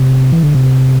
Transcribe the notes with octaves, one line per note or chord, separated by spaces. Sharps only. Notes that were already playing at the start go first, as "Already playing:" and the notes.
Already playing: C3
E3
D3
C3